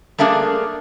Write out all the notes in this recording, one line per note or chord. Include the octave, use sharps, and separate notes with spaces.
G3 A3 A#3 D4 G#4